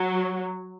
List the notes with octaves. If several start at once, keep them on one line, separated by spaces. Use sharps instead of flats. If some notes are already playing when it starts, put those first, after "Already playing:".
Already playing: F#3